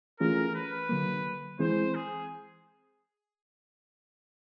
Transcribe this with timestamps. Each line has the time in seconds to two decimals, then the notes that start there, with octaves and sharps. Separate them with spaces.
0.20 E3 A3 C#4 F4 G#4 A#4
0.54 B4
0.89 D3 F#3 A#3
1.59 E3 G#3 C4 E4 G#4 C5
1.94 G#4